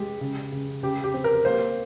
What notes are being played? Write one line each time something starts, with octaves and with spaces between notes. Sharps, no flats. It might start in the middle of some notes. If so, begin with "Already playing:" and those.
Already playing: G#3 G4
C#3
C#3
C#3 G4
G4
C4
A#4
A#3 C5